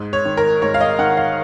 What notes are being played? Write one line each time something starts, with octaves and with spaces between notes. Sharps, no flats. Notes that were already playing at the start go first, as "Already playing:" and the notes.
Already playing: G#2
C#5
D#3
A#4
G#2 C#5
F5
D#5
D#3 F#5
F5